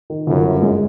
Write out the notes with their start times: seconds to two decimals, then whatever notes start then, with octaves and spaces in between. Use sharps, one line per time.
0.10 D#3
0.27 G1 F#2
0.45 G2
0.62 G#3